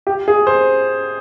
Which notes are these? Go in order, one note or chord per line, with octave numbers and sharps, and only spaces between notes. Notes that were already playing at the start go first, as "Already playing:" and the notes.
G4
G#4
C5